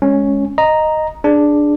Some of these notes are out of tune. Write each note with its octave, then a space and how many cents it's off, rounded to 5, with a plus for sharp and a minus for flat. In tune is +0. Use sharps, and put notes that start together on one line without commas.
G#3 +0 C#4 +0
D#5 -5 A#5 +0
D4 +0 G#4 +0